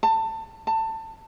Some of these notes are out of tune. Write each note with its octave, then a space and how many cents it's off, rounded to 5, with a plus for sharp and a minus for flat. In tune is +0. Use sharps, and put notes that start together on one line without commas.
A5 +25
A5 +20